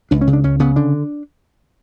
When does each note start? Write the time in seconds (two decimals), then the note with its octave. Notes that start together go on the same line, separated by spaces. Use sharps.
0.11 C#2 D4
0.21 C#4
0.27 C#3
0.33 D4
0.44 C#2 C#4
0.59 C#3 B3
0.76 D3 D4